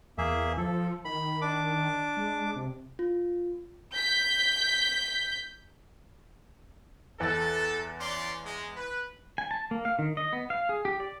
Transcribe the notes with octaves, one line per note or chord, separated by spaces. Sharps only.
E2 A#3 G#4 E5
F3 A4
D#3 B5
D4 D6
G#3
C3
F4
G6 B6
E2 A4 F#6 A6
C#4 D5 C6
G#3
B4
G#5
A5
A#3
F5
D#3
D#5
B3
F5
G#4
G4
D5